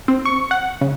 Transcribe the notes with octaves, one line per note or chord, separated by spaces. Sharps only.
C4
C#6
F#5
C#3